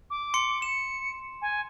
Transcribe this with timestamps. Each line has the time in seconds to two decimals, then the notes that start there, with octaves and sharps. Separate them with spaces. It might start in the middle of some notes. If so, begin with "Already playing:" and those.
0.10 D6
0.34 C6 C#7
0.62 C#7 E7
1.42 G#5